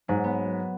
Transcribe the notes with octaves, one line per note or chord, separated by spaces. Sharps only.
G#2 F#3
B3